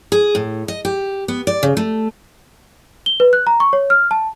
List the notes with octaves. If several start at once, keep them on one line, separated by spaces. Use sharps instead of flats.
G#4
A2
D#5
G4
B3
D5
C#3
A3
G7
B4
F#6
A#5
C#6
C#5
F6
A5